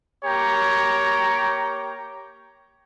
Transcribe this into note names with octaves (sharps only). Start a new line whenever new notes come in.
A#3 G4 C#5 G5 A#5